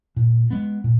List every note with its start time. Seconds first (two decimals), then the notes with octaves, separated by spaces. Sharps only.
0.16 A#2
0.51 G#3 B3
0.84 A#2